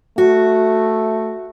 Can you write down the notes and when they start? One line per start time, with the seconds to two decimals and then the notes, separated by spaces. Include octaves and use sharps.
0.18 A3 F#4